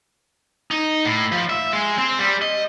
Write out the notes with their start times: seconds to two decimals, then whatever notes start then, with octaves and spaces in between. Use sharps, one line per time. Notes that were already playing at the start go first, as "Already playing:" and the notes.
0.71 D#4
1.05 A2
1.32 F3
1.50 E5
1.73 G#3
1.98 C4
2.19 G3
2.42 D#5